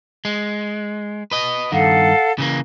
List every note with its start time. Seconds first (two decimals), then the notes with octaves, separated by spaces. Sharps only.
0.25 G#3
1.31 B4 D#5
1.72 G2 D#3 A4 F5 F#5
2.38 C#3 E3 A#3